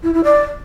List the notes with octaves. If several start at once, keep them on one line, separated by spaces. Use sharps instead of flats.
E4
E4
D5